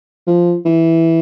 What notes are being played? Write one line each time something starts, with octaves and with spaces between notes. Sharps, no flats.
F3
E3